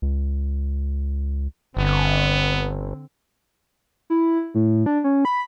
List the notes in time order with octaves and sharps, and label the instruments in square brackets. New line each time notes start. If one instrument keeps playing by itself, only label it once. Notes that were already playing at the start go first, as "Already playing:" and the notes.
[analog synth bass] C#2
[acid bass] G1 [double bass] D3 C4 [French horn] B3
[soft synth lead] E4
A2
D4
C#4
B5